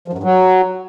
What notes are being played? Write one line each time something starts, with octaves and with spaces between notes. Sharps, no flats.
F3
F#2
G2
F#3